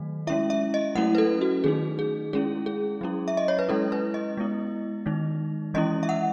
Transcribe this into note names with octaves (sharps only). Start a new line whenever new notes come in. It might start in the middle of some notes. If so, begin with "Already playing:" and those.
Already playing: D#3 F#3 A3
G#3 C#4 E4 E5
E5
D#5
F#3 A3 C#4 E4 F#5
B4
A4
F#4
D#3 A3 D#4 G#4
G#4
G#3 C#4 E4 G#4
G#4
F#3 C#4 E4
E5
D#5
C#5
B4
G#3 C#4 E4 A4
B4
D#5
G#3 B3 E4
D#3 G#3 D#4
E3 G#3 C#4 E4 D#5
E5
F#5